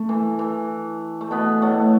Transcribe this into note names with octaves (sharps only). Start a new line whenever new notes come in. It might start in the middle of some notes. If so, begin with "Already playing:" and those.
Already playing: A3
E3
E3
A3
B2 B3
A2 A3